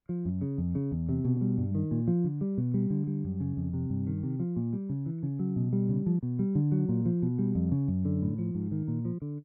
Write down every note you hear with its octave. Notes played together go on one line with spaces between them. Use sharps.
F3
F#2
C#3
F2
C#3
E2
C3
B2
G3
G2
D#3
A#2
F3
D3
G3
B2
G3
D3
G3
F#2
C#3
F2
C3
G2
D#3
C3
F3
A#2
G3
C#3
E3
C#3
F#3
B2
G3
C#3
F3
B2
G3
D3
F#3
A#2
F3
B2
G3
F2
C#3
F#2
D3
A2
F3
G#2
D#3
A#2
F3
D3